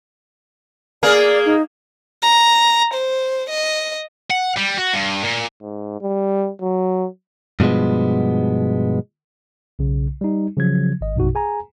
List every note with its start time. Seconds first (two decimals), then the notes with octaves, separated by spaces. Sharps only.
1.03 A#3 G#4 A#4 D5
1.45 D#4
2.22 A#5
2.94 C5
3.49 D#5
4.30 F#5
4.57 G3
4.78 F#4
4.93 G2
5.24 A#2
5.62 G#2
6.01 G3
6.61 F#3
7.60 G2 B2 F3 G#3 B3
9.79 B1 C#3
10.21 G3 D#4
10.57 C#3 F3 F#3 G#6
11.01 G#1 D#5
11.16 A#1 F#2 B2 D#4 F#4
11.35 G#4 G#5 A#5